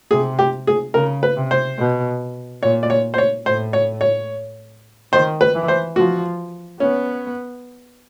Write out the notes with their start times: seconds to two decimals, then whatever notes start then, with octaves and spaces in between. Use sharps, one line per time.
0.11 C3 G#4
0.39 G4
0.67 G#4
0.94 C#3 A#4
1.23 B4
1.37 C3
1.51 C5
1.78 B2
2.62 A#2 C#5
2.83 D5
2.90 C#5
3.14 C5
3.18 C#5
3.46 A2 C5
3.73 C#5
4.01 C#5
5.13 D#3 C5
5.41 B4
5.55 E3
5.68 C5
5.96 F3 F#4
6.80 B3 C#4